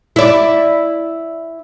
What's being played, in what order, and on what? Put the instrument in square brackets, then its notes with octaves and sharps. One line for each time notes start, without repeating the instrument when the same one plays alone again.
[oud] E4 D5